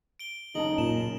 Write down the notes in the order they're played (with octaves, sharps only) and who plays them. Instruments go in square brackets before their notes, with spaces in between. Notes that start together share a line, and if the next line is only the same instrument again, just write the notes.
[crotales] D7 G7
[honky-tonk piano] F#1 C#3 A5 [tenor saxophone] D#4 [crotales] F#7
[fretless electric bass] A#2 [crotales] E7